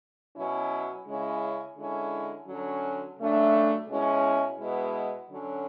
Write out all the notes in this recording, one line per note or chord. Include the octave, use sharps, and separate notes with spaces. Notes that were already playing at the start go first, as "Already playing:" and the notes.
B2 F#3 C#4 E4
C#3 G#3 C#4 E4
D3 G#3 C#4 E4
D3 F#3 C#4
C#3 F#3 A3 D4
B2 G#3 C#4 E4
B2 G#3 B3 E4
D3 F#3 C#4